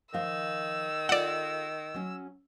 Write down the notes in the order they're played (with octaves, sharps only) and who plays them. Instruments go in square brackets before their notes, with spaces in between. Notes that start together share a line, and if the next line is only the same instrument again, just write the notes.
[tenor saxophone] D#3 [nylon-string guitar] F3 F5 [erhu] E6
[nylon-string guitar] F4 A4 [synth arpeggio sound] D5 F#5
[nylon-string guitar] F#3 C#4